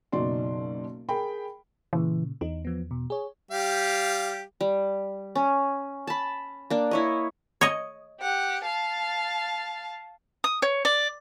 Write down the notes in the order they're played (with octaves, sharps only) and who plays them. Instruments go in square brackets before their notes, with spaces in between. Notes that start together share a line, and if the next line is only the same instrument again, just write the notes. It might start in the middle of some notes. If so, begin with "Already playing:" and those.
[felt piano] F#1 B1 F#3 D#4 D5 C6
G#4 A#4 G5 B5
[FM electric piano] A#2 C#3 [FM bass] E3
[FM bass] E2 [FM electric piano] D#4
[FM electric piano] F3 B3
B2
G#4 C#5
[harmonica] G3 G4 F5
[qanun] G3
C#4
A5 B5
A#3 D4
E4 C#5 D#5
[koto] C#5 D#5
[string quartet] G4 F#5
F5 A5
[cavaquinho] D#6
C#5
D5